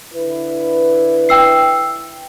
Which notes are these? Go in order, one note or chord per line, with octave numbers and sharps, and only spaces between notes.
D3 E4 B4
G5 E6 C7